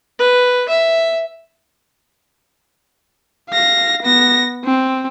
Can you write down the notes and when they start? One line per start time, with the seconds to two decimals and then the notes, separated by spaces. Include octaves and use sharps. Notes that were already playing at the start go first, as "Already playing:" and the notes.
0.19 B4
0.68 E5
3.50 F5 A#6
4.03 B3 A#6
4.64 C4